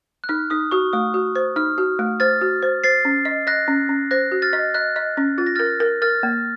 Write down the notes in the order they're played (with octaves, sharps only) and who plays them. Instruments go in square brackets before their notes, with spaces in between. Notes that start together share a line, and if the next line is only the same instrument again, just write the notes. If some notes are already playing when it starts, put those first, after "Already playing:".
[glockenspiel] F#6
[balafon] D#4 [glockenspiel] F6
[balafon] D#4 [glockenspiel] D#6
[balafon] F#4 [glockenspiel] C#6
[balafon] A3 [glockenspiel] D#6
[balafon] F#4
C5
[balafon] D#4 [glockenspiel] F6
[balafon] F#4
A3
[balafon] C5 [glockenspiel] F6 A6
[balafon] F#4
C5
[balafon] C5 [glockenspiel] A6 C7
[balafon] C#4
D#5
[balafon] D#5 [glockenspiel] F#6 A#6
[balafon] C#4
C#4
[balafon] C5 [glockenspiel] F#6 A#6
[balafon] F#4
[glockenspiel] F6 A6
[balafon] D#5
[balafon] D#5 [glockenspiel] F#6
[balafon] D#5
C#4
[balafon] F4 [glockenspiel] A6
[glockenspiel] A#6
[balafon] A#4 [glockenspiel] F6 A6
[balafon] A#4
[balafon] A#4 [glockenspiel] F6 A6
[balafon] A#3